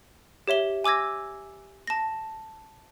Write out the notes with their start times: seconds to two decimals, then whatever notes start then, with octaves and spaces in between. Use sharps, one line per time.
0.48 G4 C#5 E5 G7
0.84 G#5 D6 E6 G#6 A#6
1.87 A5 A#6